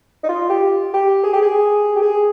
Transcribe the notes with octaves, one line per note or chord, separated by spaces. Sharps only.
D#4
F4
G4
G4
G#4
G4
G#4
G4
G#4